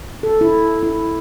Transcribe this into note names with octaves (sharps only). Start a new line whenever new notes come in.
A4
E4
E4